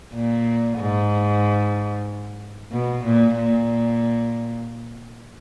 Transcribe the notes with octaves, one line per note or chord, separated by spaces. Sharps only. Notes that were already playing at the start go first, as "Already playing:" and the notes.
A#2
G#2
B2
A#2
A#2